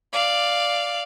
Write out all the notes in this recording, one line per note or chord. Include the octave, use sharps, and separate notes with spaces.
D5 F5